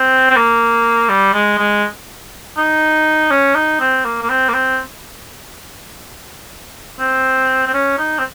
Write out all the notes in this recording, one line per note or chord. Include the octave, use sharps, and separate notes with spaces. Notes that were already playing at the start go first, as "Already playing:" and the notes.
Already playing: C4
C4
A#3
G3
G#3
G#3
D#4
C#4
D#4
C4
A#3
A#3
C4
A#3
C4
C4
C4
C#4
D#4
C4